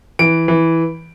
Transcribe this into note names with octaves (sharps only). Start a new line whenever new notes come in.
E3 D7
E3